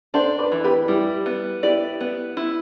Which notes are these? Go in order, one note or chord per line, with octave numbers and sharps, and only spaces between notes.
D4 A4 C5
B4 D5
E3
G4 B4
G3 E4 G4
B3
E4 G4 D5
B3
E4